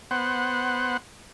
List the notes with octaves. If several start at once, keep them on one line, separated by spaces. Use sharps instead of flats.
B3 C5 F#5